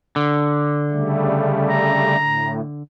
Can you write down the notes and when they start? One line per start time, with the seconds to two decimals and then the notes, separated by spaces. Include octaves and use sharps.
0.16 D3
0.90 C#3 G3 A3
1.70 A#5
2.20 A2